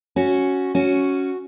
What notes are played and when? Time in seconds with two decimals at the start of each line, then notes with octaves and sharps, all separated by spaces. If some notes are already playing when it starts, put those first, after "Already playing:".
0.16 C#4 F#4
0.75 C#4 F#4